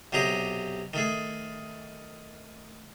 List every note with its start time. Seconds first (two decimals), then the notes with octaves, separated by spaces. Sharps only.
0.12 B1 C3 G4 G#4 A#5
0.93 D#3 A3 G#4